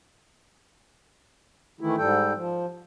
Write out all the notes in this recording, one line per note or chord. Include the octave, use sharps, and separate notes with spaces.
D#3 E3 A3 E4
G#2 G3 A4 G5
F3